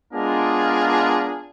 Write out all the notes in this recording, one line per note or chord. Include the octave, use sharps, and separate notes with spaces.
G#3 B3 D4 F4 G#4 A#4